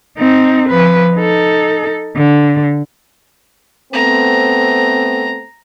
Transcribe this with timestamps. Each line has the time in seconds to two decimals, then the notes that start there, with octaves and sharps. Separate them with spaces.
0.18 C4 D#4
0.69 F3 B4
1.16 D#4 A4
2.16 D3
3.93 A3 B3 C4 A#5